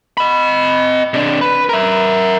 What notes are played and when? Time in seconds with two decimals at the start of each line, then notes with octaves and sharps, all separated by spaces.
0.17 D#5 B5
1.14 C3 D4
1.41 B4
1.69 A#4 E5